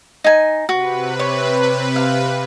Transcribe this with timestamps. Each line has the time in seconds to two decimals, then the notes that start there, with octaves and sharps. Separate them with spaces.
0.24 D#4 G#5
0.69 C3 F#4 B4
1.19 C#5
1.96 F5